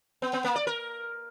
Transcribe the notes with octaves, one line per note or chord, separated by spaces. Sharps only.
B3
B3
A#3
D5
A#4